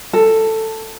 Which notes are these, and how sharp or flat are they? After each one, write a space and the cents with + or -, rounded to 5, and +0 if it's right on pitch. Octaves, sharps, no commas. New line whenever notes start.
A4 +10